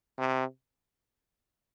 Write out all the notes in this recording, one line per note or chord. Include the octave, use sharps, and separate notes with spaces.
C3